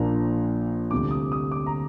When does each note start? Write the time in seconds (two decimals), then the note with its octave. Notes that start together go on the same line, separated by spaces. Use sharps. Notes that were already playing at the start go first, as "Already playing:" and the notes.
Already playing: A#1 A#2 F3 A#3 D4 A#5
0.91 D2 C3 G3 D6
1.11 D#6
1.32 D#6
1.52 D6
1.66 A#5